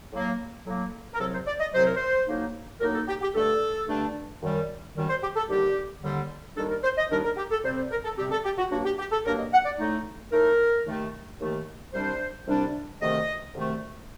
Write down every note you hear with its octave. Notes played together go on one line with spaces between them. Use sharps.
A2 F#3 A#3
A2 F#3 A#3
A#4
C2 C3 F#3 A4
C5
D5
D#5
C2 C3 F#3 C5
A#4
C5
A2 F#3 A#3 D#4
A2 F#3 A#3 D#4 A#4
A4
G4
G4
G2 D3 A3 D4 A4
G2 D3 A3 D4
F#2 D#3 G3
F#2 D#3 G3
C5
G4
A4
D#2 D3 G3 G4
D#2 D3 G3
D#2 D#3 G3 D4 A4
A#4
C5
D#5
D#2 D#3 G3 D4 A#4
A#4
G4
A4
C3 G3 C4 C5
C5
A#4
A4
C3 G3 C4 G4
A4
G4
F#4
G2 F#3 A#3 D4 F#4
G4
G4
A4
G2 F#3 A#3 D4 A#4
D#5
F#5
D5
A2 A3 D#4
A2 A3 D#4 A#4
D#2 D#3 A3
D#2 D#3 A3
C2 C3 G3 D4 C5
C2 C3 G3 D4
D2 C3 D#3 A3 D#5
D2 C3 D#3 A3